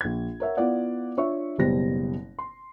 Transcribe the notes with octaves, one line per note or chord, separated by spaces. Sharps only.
A#1 G#6
A#4 C#5 E5 F#5
B3 E4 F4 D5 F5 F#5
D4 F4 C#5 E5 C#6
F#1 B2 G3 C5 A#6
C6